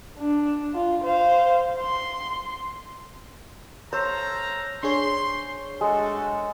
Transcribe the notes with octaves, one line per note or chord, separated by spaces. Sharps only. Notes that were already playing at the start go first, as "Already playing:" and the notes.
D4
F4
C5 F5
C6
A4 C5 C#5 F5 A#5 E6
D4 G#4 C#5 C6
G#3 A3 F#4 A4